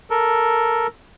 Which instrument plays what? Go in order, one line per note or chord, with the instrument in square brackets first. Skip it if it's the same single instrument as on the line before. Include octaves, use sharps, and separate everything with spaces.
[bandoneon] A4 A#4